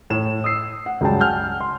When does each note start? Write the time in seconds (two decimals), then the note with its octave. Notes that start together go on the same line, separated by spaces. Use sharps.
0.10 A2 E7
0.44 D#6 E6 C7
0.86 F#5
1.01 C#2 G2 F#3 G3 G5 A5
1.21 F#5 G#5 F6 G6
1.60 C6